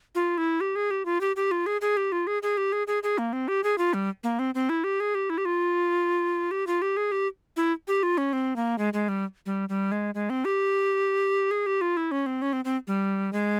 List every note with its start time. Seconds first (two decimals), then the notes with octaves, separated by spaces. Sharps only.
0.15 F4
0.38 E4
0.61 G4
0.76 G#4
0.91 G4
1.05 F4
1.21 G4
1.36 G4
1.51 F4
1.66 G#4
1.81 G#4
1.97 G4
2.12 F4
2.27 G#4
2.43 G#4
2.57 G4
2.72 G#4
2.87 G#4
3.03 G#4
3.18 A#3
3.33 C4
3.48 G4
3.64 G#4
3.78 F4
3.94 G3
4.24 A#3
4.39 C4
4.55 C4
4.69 E4
4.84 G4
5.00 G#4
5.15 G4
5.30 E4
5.38 G4
5.45 F4
6.51 G4
6.67 F4
6.82 G4
6.97 G#4
7.12 G4
7.57 E4
7.88 G4
8.03 F4
8.18 C#4
8.33 C4
8.56 A#3
8.78 G#3
8.93 G#3
9.09 G3
9.46 G3
9.69 G3
9.92 G#3
10.15 G#3
10.30 C4
10.45 G4
11.51 G#4
11.66 G4
11.81 F4
11.97 E4
12.11 C#4
12.26 C4
12.42 C#4
12.53 C4
12.65 C4
12.87 G3
13.33 G#3